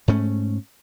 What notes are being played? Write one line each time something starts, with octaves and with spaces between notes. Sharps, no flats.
G#2 A3 C#4